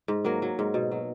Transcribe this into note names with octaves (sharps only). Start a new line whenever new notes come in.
G#2
F#3 A#3
F#3
G#2
B2
F#3